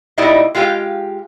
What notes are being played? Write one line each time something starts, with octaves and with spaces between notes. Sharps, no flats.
A#2 G3 D#4 E4 D5 D#5
G#3 F4 G4 E5 F5 G5